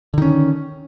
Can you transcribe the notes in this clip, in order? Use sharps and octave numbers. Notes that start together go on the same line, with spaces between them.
D3 D#3 C#4